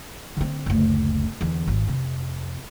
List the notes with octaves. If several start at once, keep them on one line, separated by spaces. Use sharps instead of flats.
D3 C4
F#1 D2
E2 D3
G#1
F2 C3